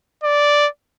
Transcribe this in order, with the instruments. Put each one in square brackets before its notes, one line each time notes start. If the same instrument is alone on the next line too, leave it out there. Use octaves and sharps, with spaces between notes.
[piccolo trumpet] D5